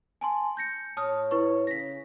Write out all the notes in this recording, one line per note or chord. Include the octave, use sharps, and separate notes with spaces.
G#5 A5 C6
G6 A#6 C#7
A2 C#5 A5 D#6 F6
E4 B4 C#6
C#3 A#6 B6